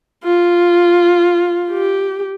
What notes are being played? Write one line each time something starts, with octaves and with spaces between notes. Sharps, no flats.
F4
G4